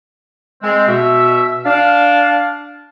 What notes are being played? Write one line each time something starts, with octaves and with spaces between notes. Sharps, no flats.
G#3 C4
B2 E5
D4 F5